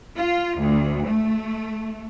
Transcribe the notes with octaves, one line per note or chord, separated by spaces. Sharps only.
F4
D2
A3